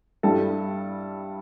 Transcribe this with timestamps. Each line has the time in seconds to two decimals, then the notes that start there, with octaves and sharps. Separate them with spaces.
0.23 G2 G3 E4 A4